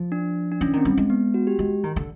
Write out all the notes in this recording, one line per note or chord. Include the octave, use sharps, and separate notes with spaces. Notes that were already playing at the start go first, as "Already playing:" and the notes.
Already playing: F3
D4
D4
E3 C#4
D#3 C4
G3
G#3
B3
F#4
G4
G#3
D#3
D3